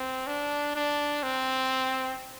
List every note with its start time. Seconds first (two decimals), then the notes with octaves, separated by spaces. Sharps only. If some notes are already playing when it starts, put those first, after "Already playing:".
Already playing: C4
0.27 D4
0.75 D4
1.23 C4